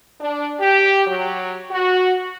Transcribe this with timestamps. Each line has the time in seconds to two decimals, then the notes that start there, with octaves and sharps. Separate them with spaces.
0.20 D4
0.60 G4
1.07 F#3
1.70 F#4